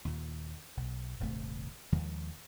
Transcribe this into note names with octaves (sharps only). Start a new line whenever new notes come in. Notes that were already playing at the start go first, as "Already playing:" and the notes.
D#2 A#2
B1
D#1 G#1 C3 A3
D#2 D#3 F3 G#3